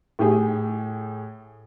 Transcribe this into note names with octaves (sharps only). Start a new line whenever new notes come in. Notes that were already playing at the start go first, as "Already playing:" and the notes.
A2 G4 G#4